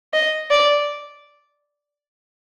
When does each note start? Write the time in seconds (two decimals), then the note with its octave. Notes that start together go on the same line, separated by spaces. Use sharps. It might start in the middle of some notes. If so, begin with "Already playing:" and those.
0.14 D#5
0.51 D5